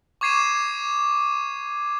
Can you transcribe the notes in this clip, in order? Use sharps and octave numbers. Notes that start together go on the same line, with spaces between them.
C#6 D6 G#6 C7 D#7 E7